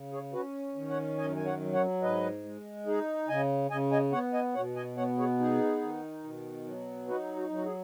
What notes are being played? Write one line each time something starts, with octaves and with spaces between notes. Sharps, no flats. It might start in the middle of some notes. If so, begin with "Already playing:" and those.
Already playing: C#3
G#4 C#5
C#4 F#4 B4
D#3
C#5 F#5
F#2 D#5 G#5
G#5
C#5 F#5
F#3
C#5 F#5
G#2 B4 D#5
G#3
D#4 G#4
C#3 D#5 G#5
C#3 D#5 G#5
D#5 G#5
B3 C#5 F#5
D#5 G#5
B2 C#5 F#5
D#5 G#5
B3 C#5 F#5
G#4 C#5
D#4 G#4
D#3
B2
F#3
D#4 F#4 B4
F#4
F#3
F#4
G#4